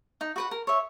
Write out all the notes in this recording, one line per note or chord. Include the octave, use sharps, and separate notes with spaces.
D#4
F#4 B4 F#5
A#4
C#5 E5